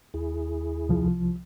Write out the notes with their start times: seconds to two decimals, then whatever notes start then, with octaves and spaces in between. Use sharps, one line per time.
0.14 D#2 E4 G#4
0.89 C2 F3